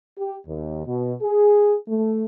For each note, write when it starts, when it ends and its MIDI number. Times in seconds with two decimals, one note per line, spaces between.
0.19 0.36 67
0.48 0.86 39
0.86 1.14 47
1.22 1.76 68
1.89 2.25 57